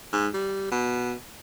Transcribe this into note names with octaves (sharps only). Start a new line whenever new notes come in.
G#2
G3
B2